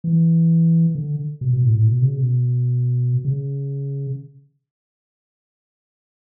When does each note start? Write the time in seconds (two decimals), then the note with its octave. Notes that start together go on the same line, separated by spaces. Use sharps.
0.04 E3
0.95 D3
1.41 B2
1.53 B2
1.64 A2
1.75 A2
1.87 B2
2.02 C#3
2.17 B2
3.25 C#3